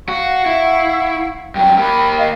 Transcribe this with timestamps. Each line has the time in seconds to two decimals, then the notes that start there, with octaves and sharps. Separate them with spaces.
0.09 F#4 F5 F#5 C#6
0.46 E4
1.55 G2 F#3 G5
1.78 A#3 G4 B5
2.18 D#5 F5